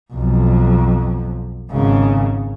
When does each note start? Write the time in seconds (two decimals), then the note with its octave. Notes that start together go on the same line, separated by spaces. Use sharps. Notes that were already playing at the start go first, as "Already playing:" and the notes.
0.12 B1 F2
1.71 G#1 C#3